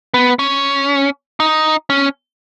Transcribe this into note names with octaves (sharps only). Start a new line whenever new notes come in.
B3
C#4
D#4
C#4